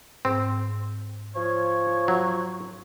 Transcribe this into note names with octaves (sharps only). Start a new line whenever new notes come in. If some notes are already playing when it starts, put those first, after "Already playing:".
G#2 C4
F3 C#5
F#3